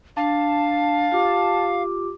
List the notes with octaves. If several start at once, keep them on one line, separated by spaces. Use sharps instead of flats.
D4 F5 A5
F4 G4 D6